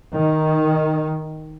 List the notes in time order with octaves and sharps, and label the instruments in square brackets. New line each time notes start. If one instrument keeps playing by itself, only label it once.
[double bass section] D#3